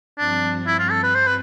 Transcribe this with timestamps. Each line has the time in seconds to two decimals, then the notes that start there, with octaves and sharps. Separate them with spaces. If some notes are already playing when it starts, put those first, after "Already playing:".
0.19 G2 F3 C4 D4
0.67 E4
0.79 F4
0.91 A4
1.03 B4
1.15 C5
1.27 B4